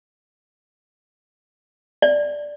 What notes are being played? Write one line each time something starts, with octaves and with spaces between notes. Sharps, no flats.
D5